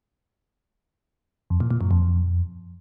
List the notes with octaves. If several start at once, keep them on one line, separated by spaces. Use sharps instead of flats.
F2
A#2
A#2
F#2
F2